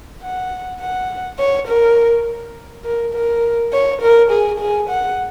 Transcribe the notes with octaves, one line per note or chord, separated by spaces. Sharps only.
F#5
F#5
C#5
A#4
A#4
A#4
C#5
A#4
G#4
G#4
F#5